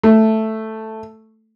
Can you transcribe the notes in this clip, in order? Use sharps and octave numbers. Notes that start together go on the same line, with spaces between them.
A3